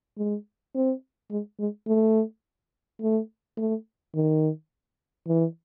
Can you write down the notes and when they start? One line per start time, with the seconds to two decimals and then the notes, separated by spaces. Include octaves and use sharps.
0.17 G#3
0.75 C4
1.31 G#3
1.59 G#3
1.87 A3
3.01 A3
3.57 A3
4.15 D#3
5.28 E3